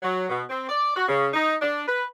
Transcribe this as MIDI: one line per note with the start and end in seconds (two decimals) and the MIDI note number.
0.03 0.29 54
0.29 0.42 47
0.50 0.67 60
0.69 0.95 74
0.97 1.07 66
1.09 1.29 49
1.34 1.55 63
1.62 1.84 62
1.88 2.05 71